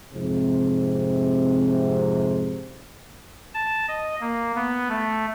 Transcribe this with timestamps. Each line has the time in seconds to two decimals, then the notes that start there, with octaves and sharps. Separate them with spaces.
0.14 F2 G#2 C3
3.54 A5
3.88 D#5
4.21 A#3
4.56 B3
4.89 A3